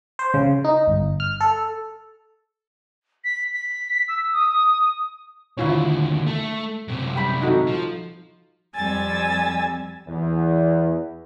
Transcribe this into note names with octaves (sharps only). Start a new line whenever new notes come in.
C5
C#3
D#4
G1
F6
A4
B6
B6
E6
D#6
D#2 D3 E4 F4 C#5
A3
F#2 C3
G3 G5 B5
D#4 F#4 A4
F3
F2 G3 G#5 E6 A6
E2